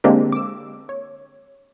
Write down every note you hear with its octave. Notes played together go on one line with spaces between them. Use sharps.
D3 G#3 A#3 C4 D4 G4
D6 E6
C#5